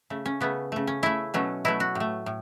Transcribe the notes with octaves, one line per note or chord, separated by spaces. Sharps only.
C#3 A3
C#4
C#3 A3 B3
C#3 A3
C#4
C#3 A3 E4
B2 F#3 A3 C#4
B2 F#3 A3 E4
F#4
A2 A3
A2